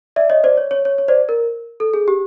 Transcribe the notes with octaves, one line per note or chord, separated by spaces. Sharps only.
D5 E5
C#5 D#5
C5 D5
C#5
C#5
C#5
C#5
C5 D5
A#4
A4
G#4
G4